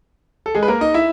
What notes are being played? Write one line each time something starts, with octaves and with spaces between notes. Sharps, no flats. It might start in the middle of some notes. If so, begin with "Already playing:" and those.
A4
G#3 G#4
B4
A#3 A#4
D#4 D#5
E4 E5